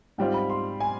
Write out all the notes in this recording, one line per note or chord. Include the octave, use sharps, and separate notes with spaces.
G#2 G3 C4 F4 G5
B5
C6
G#5